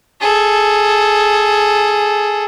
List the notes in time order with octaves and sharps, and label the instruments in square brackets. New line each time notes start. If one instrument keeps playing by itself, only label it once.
[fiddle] G#4 A4